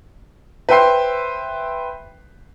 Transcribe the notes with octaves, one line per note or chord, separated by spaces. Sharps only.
B4 C5 E5 G5 C6 C7